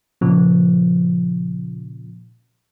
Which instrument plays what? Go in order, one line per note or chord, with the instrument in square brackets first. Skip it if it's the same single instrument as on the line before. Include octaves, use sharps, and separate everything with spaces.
[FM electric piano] A#2 C#3 F3